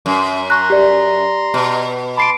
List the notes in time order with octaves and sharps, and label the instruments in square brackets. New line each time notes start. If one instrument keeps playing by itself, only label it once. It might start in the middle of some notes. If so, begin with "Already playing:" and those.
[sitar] F#2
[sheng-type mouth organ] A#5 C6 [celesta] C#6 F#6
[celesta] G4 D5
[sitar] B2
[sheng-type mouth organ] A5 C6 D6 [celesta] B5 C7 D7